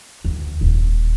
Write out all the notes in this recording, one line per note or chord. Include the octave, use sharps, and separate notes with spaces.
D2
D#1